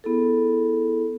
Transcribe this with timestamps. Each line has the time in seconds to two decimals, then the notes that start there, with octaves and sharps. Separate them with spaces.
0.04 B3 E4 G#4 A4